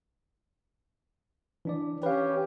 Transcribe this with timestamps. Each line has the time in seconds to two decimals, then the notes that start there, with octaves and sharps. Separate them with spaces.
1.65 E3 D4 D5
2.03 C#4 G4 B4 F5